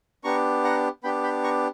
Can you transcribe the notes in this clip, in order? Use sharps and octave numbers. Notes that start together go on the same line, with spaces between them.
B3 D4 G4 A#5 C#6
F#5 A#5
B3 D4 G4 G5 B5
G5 B5
A#5 C#6